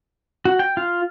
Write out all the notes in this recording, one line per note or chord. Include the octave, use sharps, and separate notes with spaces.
F#4
G5
F4